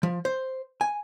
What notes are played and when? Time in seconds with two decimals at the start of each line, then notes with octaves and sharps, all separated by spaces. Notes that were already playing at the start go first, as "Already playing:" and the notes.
0.03 F3
0.25 C5
0.81 G#5